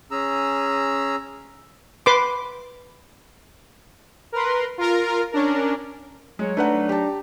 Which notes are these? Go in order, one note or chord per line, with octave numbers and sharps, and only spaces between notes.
C#4 G#4 A#5 E6
B4 C6 D6
A#4 B4 C6
F4 A#4
C#4 D4 A#4
F#3 G#3 C#5
F#3 A3 D4 D#4 B4 F#5
G4 A5